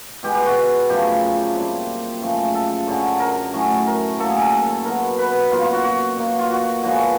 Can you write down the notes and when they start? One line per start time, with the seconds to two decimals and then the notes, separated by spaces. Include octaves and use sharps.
0.23 B2 G#3 B3 G4
0.35 G4
0.46 F#4
0.89 F#2 C#3 F3 A3 G4
1.55 A#2 G3 C4
2.21 F#2 C#3 F3 A3
2.55 A4
2.87 F#2 D3 F#3
3.20 A#4
3.53 A2 F#3 A3 C#4
3.87 A#4
4.19 A2 F#3 A#3 A4
4.30 G#4
4.41 A4
4.85 B2 F#3 B3 A#4
5.19 B4
5.51 B2 F#3 A#3 F4
5.62 F4
5.73 F#4
5.84 F#4
6.17 B2 F#3 A#3
6.39 F4
6.51 F#4
6.83 D3 F3 G#3 B3 F#4